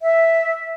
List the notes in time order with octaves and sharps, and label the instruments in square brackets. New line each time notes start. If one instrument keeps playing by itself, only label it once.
[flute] E5